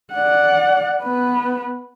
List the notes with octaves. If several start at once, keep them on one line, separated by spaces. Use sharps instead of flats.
D5 F#5
B3 B4